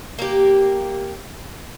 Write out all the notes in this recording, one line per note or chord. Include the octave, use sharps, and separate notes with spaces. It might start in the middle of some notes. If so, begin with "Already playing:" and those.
A#3 G4